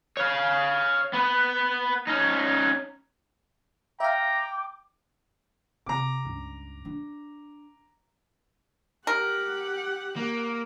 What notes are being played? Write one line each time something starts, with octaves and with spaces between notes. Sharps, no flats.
C#5 F5
B3 B4
C#4 D#4
E5 F5 G5 A#5 D6
C3 C4 A#5 D6
C#2 G2
D4
G4 A#4 F#5
A#3